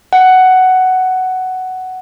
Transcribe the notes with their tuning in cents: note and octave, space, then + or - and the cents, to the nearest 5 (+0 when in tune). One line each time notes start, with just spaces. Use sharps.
F#5 +10